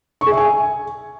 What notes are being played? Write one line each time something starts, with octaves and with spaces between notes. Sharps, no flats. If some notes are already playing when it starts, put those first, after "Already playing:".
C#6
G#4
E5
G#5